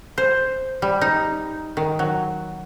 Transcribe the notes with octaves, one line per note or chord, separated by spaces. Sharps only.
C5
G3
D#4
D#3
F#3